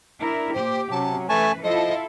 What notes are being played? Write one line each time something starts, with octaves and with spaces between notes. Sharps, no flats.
D4 E4 A#4
A#2 A#3 G4 C5
C3 F#3 C#4 A5
E3 A3 B4 G#5 A5 C#6
F3 E4 F4 A4 D#5